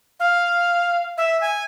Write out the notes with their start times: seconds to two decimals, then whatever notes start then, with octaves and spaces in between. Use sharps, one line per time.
0.20 F5
1.18 E5
1.41 G#5